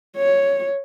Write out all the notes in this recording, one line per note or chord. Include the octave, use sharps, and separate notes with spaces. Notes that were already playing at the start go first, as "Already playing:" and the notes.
C#5